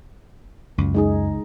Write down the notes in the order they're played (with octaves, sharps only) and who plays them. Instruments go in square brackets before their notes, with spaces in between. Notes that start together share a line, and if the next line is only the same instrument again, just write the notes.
[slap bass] C#2 [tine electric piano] F#2
[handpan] G#3 D#4 G#4